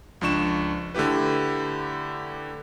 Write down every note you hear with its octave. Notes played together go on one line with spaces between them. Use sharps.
C#2 F3 D4 C#6 E7
D3 A3 E4 G4 B4